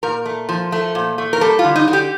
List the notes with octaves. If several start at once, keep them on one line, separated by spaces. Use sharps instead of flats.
A#2 A#4
A3
F3
A3
A#2
A3
A#4
G3 A4
F4
D3
D#4
D3
G4